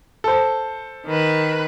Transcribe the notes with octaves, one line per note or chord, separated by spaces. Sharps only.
A4 C5
D#3 B4